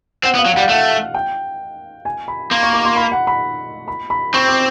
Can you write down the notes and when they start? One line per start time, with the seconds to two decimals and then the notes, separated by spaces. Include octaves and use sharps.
0.23 C4 F#5
0.35 B3
0.38 F5
0.46 F#3
0.54 F#5
0.57 G3
0.62 F5
0.69 A3 F#5
1.14 G5
2.05 G#5
2.28 B5
2.51 A#3 C6
2.63 C#6
2.73 D6
2.85 C6
2.96 B5
3.12 F#5
3.27 B5
3.88 B5
4.10 B5
4.34 C4 C#6
4.48 D6